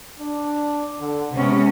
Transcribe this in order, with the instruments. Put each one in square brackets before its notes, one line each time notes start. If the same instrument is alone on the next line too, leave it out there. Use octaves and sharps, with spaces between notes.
[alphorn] D4
D3
[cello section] C3 G#3 C#4 [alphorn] B3